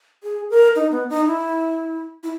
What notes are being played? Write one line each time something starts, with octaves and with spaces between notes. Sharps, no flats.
G#4
A#4
D#4
B3
D#4
E4
E4